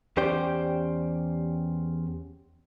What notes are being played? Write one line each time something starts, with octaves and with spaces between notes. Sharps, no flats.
E2 C#4 G4 C5 D5 G5